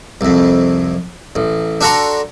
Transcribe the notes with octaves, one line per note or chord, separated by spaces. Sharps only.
C2 F2
A1
D4 F#4 A4 F#5 A#5 C6